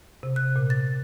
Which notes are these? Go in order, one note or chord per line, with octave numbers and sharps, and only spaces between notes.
C3
F#6
A#2
A6